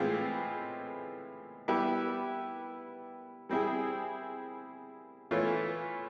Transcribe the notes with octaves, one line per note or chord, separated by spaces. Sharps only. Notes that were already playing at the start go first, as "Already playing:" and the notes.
Already playing: A2 E3 G#3 C4 F4
G3 B3 E4 G4
G3 C4 E4 G#4
E3 A3 C#4 F4